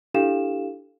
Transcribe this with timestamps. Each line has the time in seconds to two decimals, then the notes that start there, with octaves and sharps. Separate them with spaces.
0.14 D4 E4 G4 A4 F5 E7